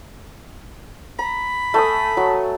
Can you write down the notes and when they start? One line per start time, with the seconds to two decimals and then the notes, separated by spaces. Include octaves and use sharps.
1.19 A#5 B5
1.74 A3 G#5 D#6
2.17 F#3